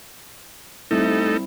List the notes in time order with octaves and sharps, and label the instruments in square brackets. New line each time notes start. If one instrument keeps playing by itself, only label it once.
[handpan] G3 C4 E4 [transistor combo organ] A3 D#4 A4